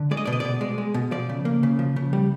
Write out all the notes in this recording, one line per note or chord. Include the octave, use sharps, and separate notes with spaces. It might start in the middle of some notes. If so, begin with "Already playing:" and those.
Already playing: D3
G#3 D5
D#5
B2 D5
D#5
B2 D5
G#3 D5
G#3
B2
F3 D5
C#3
A#3
C#3
F3
C#3
G3